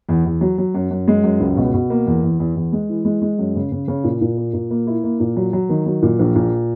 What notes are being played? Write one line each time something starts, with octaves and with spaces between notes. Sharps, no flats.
E2
E2
F#3
F#3
F#2
F#2
G#3
F#2
C#2
B2
B2
A#3
E2
E2
E2
E2
G#3
E3
G#3
G#3
F#2
C#3
C#3
C#3
A#2
A#2
A#3
A#2
A#3
E4
A#3
A#2
F#3
F#3
D#3
F#3
A#2
A#1
A#2